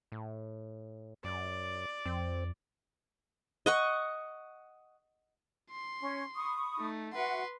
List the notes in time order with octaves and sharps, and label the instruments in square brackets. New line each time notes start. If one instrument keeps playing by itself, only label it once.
[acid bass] A2
[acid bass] F#2 [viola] D5
[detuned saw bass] F2 [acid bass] C4
[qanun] D#5 F#5 C#6
[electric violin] C6
[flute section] C#4
B5 C#6 D#6
[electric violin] A3 D#4
[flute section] F#4 E5 F#5 [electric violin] B4 C6